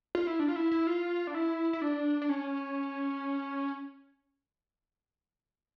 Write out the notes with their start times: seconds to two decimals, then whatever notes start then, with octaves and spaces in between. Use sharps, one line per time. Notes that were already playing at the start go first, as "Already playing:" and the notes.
0.15 F4
0.27 E4
0.40 D4
0.48 F4
0.56 E4
0.72 E4
0.87 F4
1.27 D4
1.35 E4
1.73 E4
1.82 D4
2.22 D4
2.29 C#4